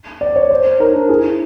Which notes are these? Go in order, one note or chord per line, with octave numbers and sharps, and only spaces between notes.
D5
C#5
C5
D#4 A#4
D4
E4 G#4